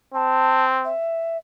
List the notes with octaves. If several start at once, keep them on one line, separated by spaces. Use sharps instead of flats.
C4 A5
E5